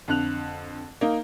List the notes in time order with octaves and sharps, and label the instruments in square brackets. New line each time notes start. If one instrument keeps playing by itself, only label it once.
[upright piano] F2 D3 F#6 F7
A#3 D#4